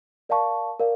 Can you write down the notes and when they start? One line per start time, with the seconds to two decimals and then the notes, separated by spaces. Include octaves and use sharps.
0.29 A#4 D5 F5 A5 C#6
0.79 A#4 D5 F5